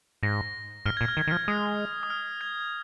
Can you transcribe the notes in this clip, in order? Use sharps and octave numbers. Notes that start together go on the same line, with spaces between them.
G#2 A#6
G#2 F6
A#2 G#6
F6
D#3 G#6
D#3
F3 F6
G#3 D#6
D#6
F6
G#6